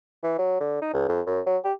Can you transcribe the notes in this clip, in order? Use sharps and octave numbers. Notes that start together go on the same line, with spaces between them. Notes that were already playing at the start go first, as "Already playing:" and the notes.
E3
F#3
D3
D#4
C#2
F2
F#2
F#3
G4